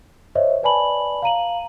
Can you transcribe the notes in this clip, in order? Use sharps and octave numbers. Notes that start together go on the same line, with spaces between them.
C5 C#5 D#5 E5
B4 D5 G#5 A5 B5 F#7
F5 A#5 D#7 F#7